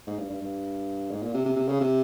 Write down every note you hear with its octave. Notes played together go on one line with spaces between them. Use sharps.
G#2
G2
G2
G2
G#2
A#2
C3
C3
C3
C#3
C3